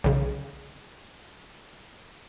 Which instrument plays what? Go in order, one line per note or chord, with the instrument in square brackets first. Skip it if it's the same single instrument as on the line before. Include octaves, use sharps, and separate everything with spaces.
[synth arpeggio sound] B1 C#3